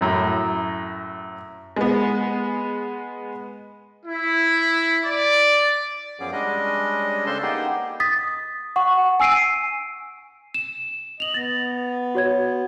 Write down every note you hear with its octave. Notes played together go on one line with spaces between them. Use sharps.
F#2 A2
G#3 B3
E4
D5
F#2 F3 B3 C#4 G#4 D6
G3 G#3 C#4 D4 D#5
C#3 D4 A4 C5 A5 C6
A#3 B3 D#4 G4 G#4
D#6 A6 B6
F#5 C#6
G#5 E6 C7 D7 D#7
E7
D#5 F7 F#7
B3 A6 A#6
F#4 C#5 G#6